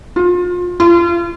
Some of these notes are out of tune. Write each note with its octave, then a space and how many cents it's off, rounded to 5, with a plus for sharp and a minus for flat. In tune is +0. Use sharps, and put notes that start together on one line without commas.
F4 +30
F4 -35